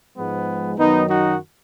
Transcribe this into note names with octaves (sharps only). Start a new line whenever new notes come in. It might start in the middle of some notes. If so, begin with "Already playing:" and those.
G#2 F3 G#3 B3
F#2 D#3 F#3 B3 D#4
D#4 F#4